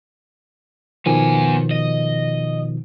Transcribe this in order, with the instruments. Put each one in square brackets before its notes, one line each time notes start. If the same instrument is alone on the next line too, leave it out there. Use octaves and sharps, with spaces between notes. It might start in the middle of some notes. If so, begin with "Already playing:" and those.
[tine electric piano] B2 D#3 F3 [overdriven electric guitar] B3 G#5
[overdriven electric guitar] D#5